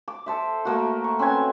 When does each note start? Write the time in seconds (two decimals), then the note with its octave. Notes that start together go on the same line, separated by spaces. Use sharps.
0.08 D6
0.26 A4 C5 E5
0.65 A3 A#3 F#4
1.04 C#6
1.19 C4 C#4 B4 G#5